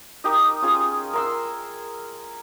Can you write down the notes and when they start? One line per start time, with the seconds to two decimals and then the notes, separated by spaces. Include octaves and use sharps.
0.24 D#4 G4 A#4 D#5
0.62 C#4 F4 G#4
1.13 A#4 C6 E6